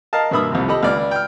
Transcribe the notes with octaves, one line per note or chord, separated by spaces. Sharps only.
A#4 D#5 F5 A5
G2 B2 A#3 E5 B5 D#6
C2 F2 C3
G4 A4 D#5 B5
C#2 D5 F6
G5 F6